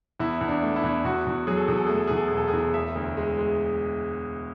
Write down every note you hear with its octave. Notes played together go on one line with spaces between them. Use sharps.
E2 E4
E2
D4
A3
E4
E2
E2 F#4
E2
F#3 G#4
A4
E2 G#4
A4
A3 G#4
A4
E2 G#4
A4
E1 G#4
A4
G#4
E2
E1 E5
D2
G#3
G#3